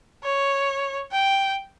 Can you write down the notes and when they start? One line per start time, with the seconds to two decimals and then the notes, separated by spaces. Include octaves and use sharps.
0.23 C#5
1.12 G5